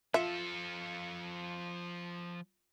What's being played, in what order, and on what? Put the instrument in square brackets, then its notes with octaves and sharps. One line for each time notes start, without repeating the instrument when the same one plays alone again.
[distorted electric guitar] F3 A4 [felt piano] F4 [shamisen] E5